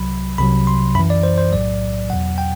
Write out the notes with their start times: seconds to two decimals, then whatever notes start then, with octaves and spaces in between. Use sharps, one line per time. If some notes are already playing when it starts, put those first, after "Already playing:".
Already playing: C2 C3 F#3 B5
0.38 C2 C3 F#3 B5
0.67 C6
0.95 F#2 E3 B5
1.10 D5
1.23 C5
1.38 C5
1.52 B1 A2 F#3 D5
2.10 E2 B2 F#3 F#5
2.38 G5